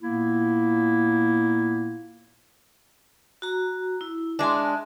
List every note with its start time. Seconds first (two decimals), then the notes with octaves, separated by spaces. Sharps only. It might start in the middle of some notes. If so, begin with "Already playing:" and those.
0.02 A#2 A#3 B3 E4
3.42 F#4 A#5
4.01 E4
4.39 G#3 D4 E5 G#5 C6